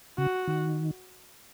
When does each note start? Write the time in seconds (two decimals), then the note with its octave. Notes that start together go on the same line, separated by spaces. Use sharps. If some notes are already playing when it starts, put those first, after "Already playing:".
0.18 C#3 F#4
0.47 D#3